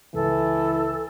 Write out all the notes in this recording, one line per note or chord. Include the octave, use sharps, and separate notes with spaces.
C#2 E3 A4